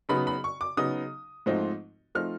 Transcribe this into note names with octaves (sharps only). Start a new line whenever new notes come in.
C#3 F#3 B3 D#4 B5
B5
C#6
D6
C#3 F#3 B3 D#4 D#6
G#2 F3 A3 C4 D#4
F3 A3 C4 D#4 F6